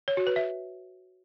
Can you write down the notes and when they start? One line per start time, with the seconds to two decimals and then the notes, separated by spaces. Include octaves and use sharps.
0.08 C#5
0.17 F#4
0.27 B4
0.36 E5